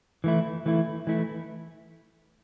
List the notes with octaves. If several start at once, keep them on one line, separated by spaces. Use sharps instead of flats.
E3 A3 E4
E3 A3 E4
E3 A3 E4